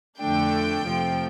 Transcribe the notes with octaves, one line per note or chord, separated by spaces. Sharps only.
F2 D3 A3 D4 G5
F2 C3 F3 A3